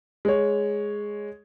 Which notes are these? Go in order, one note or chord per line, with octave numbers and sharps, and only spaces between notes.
G#3 C#5